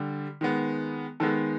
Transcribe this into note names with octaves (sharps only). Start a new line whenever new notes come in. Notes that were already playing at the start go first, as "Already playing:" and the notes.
Already playing: D3 G3
D#3 G#3 B3
D#3 G#3 B3 A4